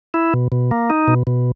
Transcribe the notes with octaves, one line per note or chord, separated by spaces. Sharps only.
E4
B2
B2
A#3
D#4
B2
B2